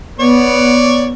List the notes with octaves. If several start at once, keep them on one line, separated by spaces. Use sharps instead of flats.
B3 C#5 D5